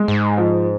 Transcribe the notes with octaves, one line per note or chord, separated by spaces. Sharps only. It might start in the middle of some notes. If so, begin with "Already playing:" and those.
Already playing: G#3
G#2
F3